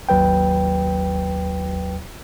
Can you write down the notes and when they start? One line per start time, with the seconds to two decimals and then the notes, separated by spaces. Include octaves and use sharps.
0.09 G#1 D#2 F#3 B4 G5